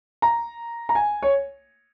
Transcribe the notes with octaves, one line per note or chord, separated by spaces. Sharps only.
A#5
A#5
G#5
C#5